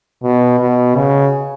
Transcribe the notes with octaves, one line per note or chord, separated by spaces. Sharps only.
B2
B2
C#3